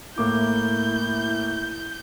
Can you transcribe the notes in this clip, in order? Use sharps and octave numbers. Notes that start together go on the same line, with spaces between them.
A2 A#3 E4 D6 G6